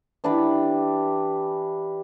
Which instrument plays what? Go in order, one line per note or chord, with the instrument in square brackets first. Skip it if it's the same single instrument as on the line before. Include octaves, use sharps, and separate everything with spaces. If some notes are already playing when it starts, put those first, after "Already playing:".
[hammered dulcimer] E3 D4 G4 B4